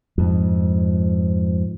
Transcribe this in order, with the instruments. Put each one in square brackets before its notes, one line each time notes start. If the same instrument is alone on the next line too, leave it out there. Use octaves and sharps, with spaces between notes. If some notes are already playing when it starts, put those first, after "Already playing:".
[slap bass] F2 G#2